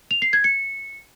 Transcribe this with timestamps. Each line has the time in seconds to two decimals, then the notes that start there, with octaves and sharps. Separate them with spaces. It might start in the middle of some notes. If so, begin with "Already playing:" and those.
0.11 F7
0.22 C7
0.33 G#6
0.44 C#7